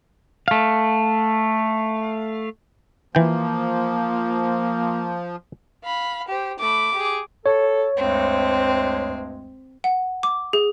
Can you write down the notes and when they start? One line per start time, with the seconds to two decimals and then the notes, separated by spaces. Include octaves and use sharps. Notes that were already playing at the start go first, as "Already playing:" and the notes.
0.48 A3 F5
3.15 E3 F3 A#3 G5
5.84 F5 B5
6.28 G4 C5
6.60 A3 B5 D6
6.94 G4 G#4
7.46 A4 C#5
7.97 D2 G2 G#3 C4
9.84 F#5
10.23 D6
10.53 G#4